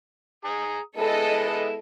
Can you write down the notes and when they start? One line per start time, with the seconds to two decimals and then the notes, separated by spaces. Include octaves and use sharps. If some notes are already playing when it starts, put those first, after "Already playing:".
0.45 G#4 A#5 D#6
0.97 G#3 B3 E4 A4 D#5